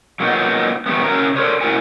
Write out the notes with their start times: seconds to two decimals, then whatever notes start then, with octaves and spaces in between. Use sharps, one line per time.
0.20 F#3 A#3 B3 C#4 D#4 F4
0.86 E3 G3 A3 B3
1.03 C#3 F#4 A#4 A#5
1.36 D4 A4 A#4 C5 C#5
1.61 A3 E4 F#4 A#4 G#5